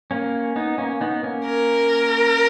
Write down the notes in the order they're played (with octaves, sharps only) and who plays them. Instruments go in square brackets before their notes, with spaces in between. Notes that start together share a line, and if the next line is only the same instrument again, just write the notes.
[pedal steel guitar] A#3 C#4
B3 D#4
A#3 C#4
B3 D#4
A#3 C#4
[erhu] A#4